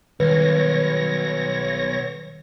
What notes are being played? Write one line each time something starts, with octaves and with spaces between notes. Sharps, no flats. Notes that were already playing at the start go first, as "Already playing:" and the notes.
B1 D#3 G3 B4 C#5 A#6